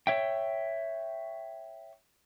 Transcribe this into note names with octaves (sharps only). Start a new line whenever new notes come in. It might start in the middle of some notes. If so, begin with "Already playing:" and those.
C#5 E5 G5